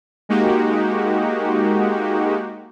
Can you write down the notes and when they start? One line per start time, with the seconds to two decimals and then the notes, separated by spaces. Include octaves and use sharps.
0.29 G#3 A#3 D#4 F#4 G4